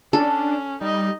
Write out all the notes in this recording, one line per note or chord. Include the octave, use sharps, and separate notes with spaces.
C#4 D4 A4
G3 D#4 D#5